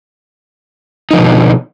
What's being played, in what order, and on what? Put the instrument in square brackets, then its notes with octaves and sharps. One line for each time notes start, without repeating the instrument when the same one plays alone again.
[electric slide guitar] D#4
F3
D3
B2